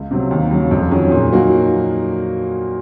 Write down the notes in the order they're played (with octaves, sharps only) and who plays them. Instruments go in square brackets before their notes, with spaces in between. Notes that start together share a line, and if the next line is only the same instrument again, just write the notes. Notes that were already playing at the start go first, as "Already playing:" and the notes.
Already playing: [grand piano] C#2
C3 F#3
D#2
C#3 F#3
F2
D#3 F#3 C#4 G#4
A#2
F#3 A#3 D#4 F#4